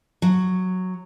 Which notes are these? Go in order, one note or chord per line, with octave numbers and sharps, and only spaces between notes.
F#3